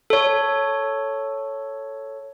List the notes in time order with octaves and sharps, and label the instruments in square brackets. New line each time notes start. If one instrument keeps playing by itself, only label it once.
[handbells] A4 C#5